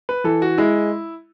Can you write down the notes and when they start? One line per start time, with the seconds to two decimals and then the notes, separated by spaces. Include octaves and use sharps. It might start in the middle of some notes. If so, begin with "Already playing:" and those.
0.09 B4
0.24 E3 A4
0.42 F#4
0.58 G#3 E4